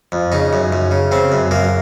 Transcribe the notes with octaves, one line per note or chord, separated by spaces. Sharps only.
F2
C#3 D#4
F#2
F#2
C#3
C#3 C4
F#2
F#2 A#3